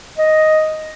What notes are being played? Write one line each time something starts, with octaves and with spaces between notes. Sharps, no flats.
D#5